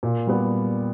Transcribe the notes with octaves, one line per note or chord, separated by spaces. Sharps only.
A#2
G3 B3